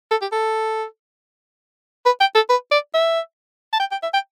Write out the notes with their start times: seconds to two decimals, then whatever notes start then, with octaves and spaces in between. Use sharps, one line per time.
0.11 A4
0.22 G4
0.32 A4
2.06 B4
2.21 G5
2.35 A4
2.50 B4
2.72 D5
2.94 E5
3.73 A5
3.80 G5
3.92 G5
4.03 E5
4.14 G5